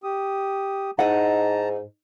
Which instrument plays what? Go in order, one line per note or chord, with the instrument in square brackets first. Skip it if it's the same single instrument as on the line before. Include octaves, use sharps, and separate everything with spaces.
[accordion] G4 D#6
[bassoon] G#2 [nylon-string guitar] D#4 E4 D#5 [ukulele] F#5 [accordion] A5 A#5